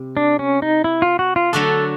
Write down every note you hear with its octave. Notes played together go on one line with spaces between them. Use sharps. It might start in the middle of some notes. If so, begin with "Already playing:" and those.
Already playing: C3 G3
D4
C#4
D#4
E4
F4
F#4
F4
D3 F#3 A3 D4 F#4 A4